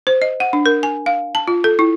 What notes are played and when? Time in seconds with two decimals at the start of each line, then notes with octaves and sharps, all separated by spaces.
0.07 C5
0.22 D#5
0.40 F#5
0.53 D4
0.66 A#4
0.83 G#5
1.06 F5
1.35 A5
1.48 F4
1.64 A4
1.79 E4